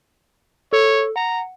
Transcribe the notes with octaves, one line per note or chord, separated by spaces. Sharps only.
A4 C#5
F#5 A#5